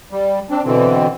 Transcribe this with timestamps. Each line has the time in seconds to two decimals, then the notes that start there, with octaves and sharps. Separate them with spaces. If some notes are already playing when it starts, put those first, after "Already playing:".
0.12 G3
0.50 C4 D4
0.65 B2 D3 E3 C4